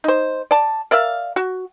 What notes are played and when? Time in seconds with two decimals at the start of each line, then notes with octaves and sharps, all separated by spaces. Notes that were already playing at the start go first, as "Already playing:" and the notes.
0.04 D#4 C5
0.51 D5 A5
0.91 A#4 D5 E5 F5
1.36 F#4